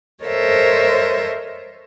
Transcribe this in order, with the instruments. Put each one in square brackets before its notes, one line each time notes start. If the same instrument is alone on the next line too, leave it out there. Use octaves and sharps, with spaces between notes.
[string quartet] A4 A#4 C5 C#5 D#5 E5